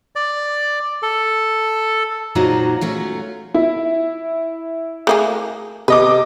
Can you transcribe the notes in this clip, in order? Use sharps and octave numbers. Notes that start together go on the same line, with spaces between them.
D5
A4
A#2 F#3 D#4 F#4 C5 D#5
F#3 A3 C#4 F4
E4
A3 A#3 G#4
C3 B4 D#5 D6